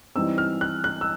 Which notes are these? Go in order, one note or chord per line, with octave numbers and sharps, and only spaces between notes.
E3 G3 C4 D#4 E6
F6
F#6
F#6
E6